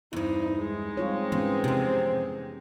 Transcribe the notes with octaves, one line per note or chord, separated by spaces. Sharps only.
E2 G2 C4 D#4 E4
G#3 D#4
G3 C4 F4 C#5
G#2 E3 B3 C#4
F2 C3 G4